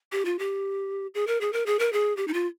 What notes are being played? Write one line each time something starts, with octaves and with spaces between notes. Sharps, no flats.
G4
F4
G4
G#4
A#4
G#4
A#4
G#4
A#4
G#4
G4
D#4
F4